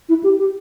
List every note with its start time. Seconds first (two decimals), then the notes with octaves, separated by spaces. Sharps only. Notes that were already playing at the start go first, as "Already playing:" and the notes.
0.09 E4
0.23 G4
0.39 G4